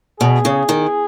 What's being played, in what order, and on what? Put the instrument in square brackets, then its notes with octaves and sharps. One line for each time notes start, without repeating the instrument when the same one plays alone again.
[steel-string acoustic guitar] B2 [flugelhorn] G#4
[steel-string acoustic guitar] C#3
D#3